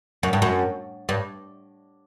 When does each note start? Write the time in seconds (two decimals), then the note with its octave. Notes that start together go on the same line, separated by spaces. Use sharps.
0.23 F#2
0.33 G2
0.42 F#2
1.09 G2